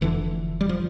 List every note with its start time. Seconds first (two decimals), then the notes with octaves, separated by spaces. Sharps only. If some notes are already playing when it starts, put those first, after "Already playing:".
0.01 F1 F2 D3 E3
0.61 G3
0.69 F3